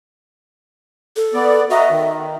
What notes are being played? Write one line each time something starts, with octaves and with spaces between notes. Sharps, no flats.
A4
B3 D5
F#4 D#5 E5 A#5
D#3